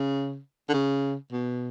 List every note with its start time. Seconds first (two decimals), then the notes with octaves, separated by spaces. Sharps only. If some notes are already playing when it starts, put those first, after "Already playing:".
Already playing: C#3
0.69 D3
0.74 C#3
1.32 B2